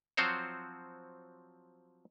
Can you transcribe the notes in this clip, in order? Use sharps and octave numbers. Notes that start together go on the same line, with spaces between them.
F3 F#3 C4 F#4 C5 C#5